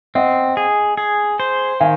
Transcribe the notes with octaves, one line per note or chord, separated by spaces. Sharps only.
C4 D#5 F#5
G#4
G#4
C5
D#3 F5 G#5